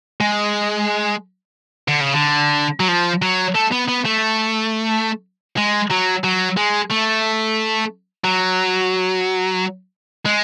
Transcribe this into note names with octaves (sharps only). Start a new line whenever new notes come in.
G#3
D3
C#3
D3
F#3
F3
F#3
A3
B3
B3
A3
G#3
F#3
F#3
G#3
A3
F#3
G#3